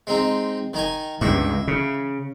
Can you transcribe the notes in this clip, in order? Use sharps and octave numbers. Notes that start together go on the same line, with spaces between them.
G#3 C4 D#4
D#3 D#4 G#5
C#2 G2 E4
C#3